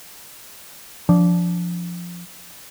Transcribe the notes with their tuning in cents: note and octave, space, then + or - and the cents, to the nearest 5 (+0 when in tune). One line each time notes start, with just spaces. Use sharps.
F3 +0 D4 -20